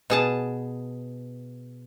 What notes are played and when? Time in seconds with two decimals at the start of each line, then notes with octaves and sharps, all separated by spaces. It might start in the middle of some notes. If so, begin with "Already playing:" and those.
0.10 B2 G#4 A5